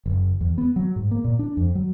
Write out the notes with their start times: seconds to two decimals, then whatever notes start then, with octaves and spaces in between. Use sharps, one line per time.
0.06 F#1
0.41 E2
0.58 B3
0.76 F#3
0.96 G#2
1.11 A#3
1.24 A#2
1.39 D4
1.57 F2
1.75 F#3